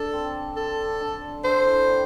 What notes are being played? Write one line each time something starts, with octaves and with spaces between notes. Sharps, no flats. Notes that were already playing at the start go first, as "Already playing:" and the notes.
Already playing: D4 A4
C4
A4
D4
D3 C5
E3
G3